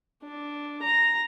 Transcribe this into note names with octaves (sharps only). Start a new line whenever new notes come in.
D4
A#5